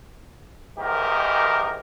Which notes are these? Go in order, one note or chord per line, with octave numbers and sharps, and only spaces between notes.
B1 G#2 D#3 E3 G4 A#4